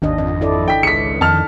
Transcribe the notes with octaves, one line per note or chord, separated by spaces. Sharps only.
G#1 D#2 D#3 D4 D#5
F2 D#5
E4 A4 D5
G5 B6
C#2 B6 C#7
F2 D#3 A5 F6